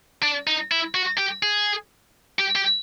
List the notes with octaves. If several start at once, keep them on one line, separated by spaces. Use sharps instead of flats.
D4
D#4
E4
F#4
G4
G#4
G4
G4